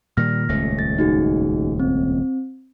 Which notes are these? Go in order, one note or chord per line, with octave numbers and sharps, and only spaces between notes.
A#2 D#3 G3 F6 A#6
D#1 C#2 A3 A#6
A6
D#4 F#4 G#4
C4